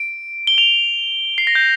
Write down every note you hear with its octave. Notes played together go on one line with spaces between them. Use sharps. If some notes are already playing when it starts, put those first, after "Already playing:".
Already playing: D7
G7
F7
C7
A#6
G6